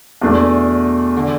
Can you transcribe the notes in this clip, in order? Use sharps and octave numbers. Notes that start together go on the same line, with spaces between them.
E2 B2 A3 D4
D3